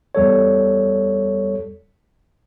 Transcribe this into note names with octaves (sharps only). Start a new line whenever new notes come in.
E2 G3 A4 C#5